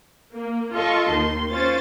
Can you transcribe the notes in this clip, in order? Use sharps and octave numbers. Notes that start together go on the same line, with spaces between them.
A#3
F4 A4 D#5 A5 C#6
D#2 D#3 C6
C#4 F4 C5 A6